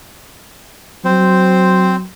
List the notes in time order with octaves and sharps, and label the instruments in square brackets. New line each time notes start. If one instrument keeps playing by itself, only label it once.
[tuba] F#3 [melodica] C4 C5